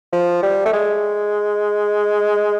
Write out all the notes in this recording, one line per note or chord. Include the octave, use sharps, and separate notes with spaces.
F3
G3
A3
G#3